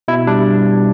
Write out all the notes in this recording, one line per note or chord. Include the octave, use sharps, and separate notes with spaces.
B2 E4
G3 D4